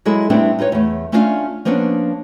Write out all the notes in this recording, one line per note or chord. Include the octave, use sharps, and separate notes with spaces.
F#3 G#3 E4 G#4 A4
G3 A3 B3 C4 D4 E4
D#4 F4 B4 C#5
E2 A3
A3 C#4 D4 E4 F4 F5
F3 A#3 B3 C#4 D4